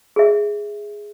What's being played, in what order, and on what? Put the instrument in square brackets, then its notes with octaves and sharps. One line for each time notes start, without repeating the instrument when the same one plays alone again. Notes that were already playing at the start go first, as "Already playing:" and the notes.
[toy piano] G#4 E5